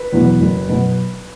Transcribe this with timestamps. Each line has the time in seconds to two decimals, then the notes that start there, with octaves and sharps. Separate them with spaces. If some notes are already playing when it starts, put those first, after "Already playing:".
Already playing: B4
0.12 E2 B2 F#3 B3
0.40 F#1
0.69 B2 F#3 B3